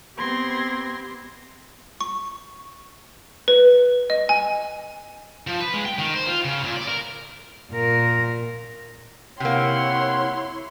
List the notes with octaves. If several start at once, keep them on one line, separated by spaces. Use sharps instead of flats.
B3 C4 G4 C6 G#6 A#6
C#6
B4
D#5
G#5
F3
B4
G#3
G5
D#3
C5
F4
C#3
A#2
D5
A#4
A#2 A#4
C3 A#3 E4 C#5 F#5 C6